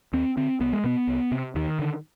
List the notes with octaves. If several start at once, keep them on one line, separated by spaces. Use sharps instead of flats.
D#2 C4
D3 C4
C2 B3
G#3
B2 B3
C2
C3
D#2 D#3
D3